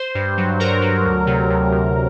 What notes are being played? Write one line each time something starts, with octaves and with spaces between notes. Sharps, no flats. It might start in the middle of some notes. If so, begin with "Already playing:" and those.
Already playing: C5
G2
F#3
F#3 A#4
F#3
D2
C3
D2
D2